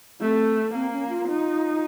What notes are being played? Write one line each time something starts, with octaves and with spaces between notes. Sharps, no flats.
A3 C4
A#3 C4
C#4
F4
D#4